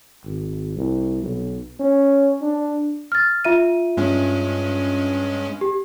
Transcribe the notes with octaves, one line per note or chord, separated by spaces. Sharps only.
G#1
C2
B1
C#4
D4
F6 A6
F4 E5 D#7
G2 G#3 C#4
G4